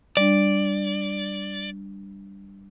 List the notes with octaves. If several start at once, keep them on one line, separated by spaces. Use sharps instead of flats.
G3 D4 D5